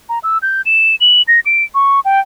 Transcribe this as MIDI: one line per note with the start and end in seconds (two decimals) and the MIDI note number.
0.09 0.19 82
0.24 0.38 88
0.42 0.62 91
0.66 0.95 100
1.01 1.22 102
1.28 1.40 94
1.46 1.64 98
1.75 2.00 85
2.05 2.20 79